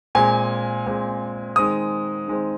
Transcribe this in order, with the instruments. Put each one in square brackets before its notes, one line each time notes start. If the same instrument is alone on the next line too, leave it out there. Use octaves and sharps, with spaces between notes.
[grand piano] A#2 G#3 C4 G#5
A#2 G#3 C4
D#3 G#3 C4 D#6
D#3 G#3 C4